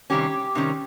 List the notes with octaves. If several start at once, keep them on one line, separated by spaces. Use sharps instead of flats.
C3 D#3 G3 C#4 G4
C3 D#3 G3 C#4